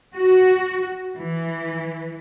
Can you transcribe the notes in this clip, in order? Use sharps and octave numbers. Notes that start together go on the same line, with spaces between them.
F#4
E3